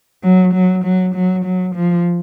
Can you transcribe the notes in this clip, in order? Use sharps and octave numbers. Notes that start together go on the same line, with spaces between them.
F#3
F#3
F#3
F#3
F#3
F3